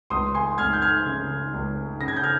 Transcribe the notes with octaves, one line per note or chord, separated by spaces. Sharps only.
C#2 C6 D#6
G#5 C6
C#2 F6 G#6
G6
F6 G#6
C#3
C#2
C#3 A#6
G#6
G6
F6 G#6